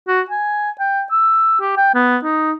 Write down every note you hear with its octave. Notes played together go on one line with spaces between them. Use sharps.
F#4
G#5
G5
E6
G4
G5
B3
D#4